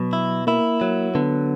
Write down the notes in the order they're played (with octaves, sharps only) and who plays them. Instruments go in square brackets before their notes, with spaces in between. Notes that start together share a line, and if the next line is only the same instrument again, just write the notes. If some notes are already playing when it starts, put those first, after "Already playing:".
Already playing: [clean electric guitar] B2 [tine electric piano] F#3 F#4
[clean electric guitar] E4
[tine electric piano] A#3 A#4 [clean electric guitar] E4
[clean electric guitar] F#3
[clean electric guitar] D3 [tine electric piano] B3 B4